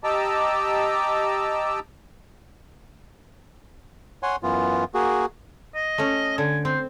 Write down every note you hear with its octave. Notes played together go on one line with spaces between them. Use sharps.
G4 D#5 A5 A#5 D6 E6
C#5 F#5 G#5 C6
F#2 E3 B3 F4
A#3 F#4 G#4
D#5
A3 C#4
D3 G#5
C4 C5